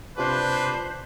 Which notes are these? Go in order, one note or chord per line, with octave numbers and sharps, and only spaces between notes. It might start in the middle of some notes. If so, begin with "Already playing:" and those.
C3 D4 F4 G4 B4 C5